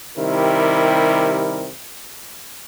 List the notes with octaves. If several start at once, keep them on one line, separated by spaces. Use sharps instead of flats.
C3 D#3 G3 E4 A#4